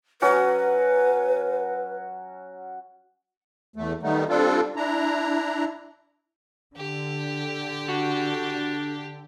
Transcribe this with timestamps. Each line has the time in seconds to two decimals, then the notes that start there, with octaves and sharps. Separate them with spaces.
0.22 F#3 C#4 F#4 B4
3.76 E2 A3
4.03 D#3 G3 A3 B3 D#4
4.29 G3 C4 D4 F4 A4
4.76 D4 E4 A#5
6.77 D3 G4
7.88 D4 F#4